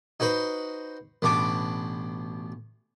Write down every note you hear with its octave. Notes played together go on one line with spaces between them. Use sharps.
D#4 F#4 B4 C5
A1 B2 D4 D6